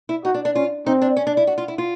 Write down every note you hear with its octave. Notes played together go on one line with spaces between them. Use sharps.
E4
D#4 F#4
D4
D4
C#4 F4
C4 D#4
D4
C#4
D4
E4
F#4
F4
E4
F4